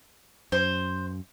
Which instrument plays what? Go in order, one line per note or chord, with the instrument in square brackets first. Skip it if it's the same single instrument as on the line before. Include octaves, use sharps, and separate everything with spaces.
[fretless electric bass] F#2 [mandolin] C5